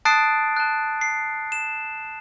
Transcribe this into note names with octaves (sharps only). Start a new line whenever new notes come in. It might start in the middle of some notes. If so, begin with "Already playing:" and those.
A5 D#6 F#6 A6 C7 D7
A5 F#6
C7
E7